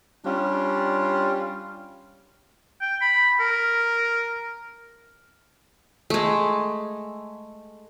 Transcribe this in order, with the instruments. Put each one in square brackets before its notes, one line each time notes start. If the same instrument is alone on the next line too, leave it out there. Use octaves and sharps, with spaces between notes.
[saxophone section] G3 C#4 D4 F4
[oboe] G5
B5
A#4
[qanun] G#3 A3